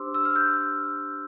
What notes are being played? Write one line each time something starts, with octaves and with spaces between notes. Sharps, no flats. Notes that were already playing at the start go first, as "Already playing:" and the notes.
Already playing: D4 G4 C5 C6 D6 E6
E6
F6
E6 G6